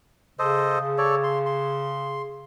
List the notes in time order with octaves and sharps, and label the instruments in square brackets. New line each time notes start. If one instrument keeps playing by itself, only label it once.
[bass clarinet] C#3 [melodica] A4 C5 D#5
[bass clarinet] C#3
[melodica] A4 C#5 D5
C6
C6